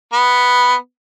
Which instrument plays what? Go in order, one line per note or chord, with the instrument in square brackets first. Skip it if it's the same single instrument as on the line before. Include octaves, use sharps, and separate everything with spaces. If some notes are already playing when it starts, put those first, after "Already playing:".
[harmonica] B3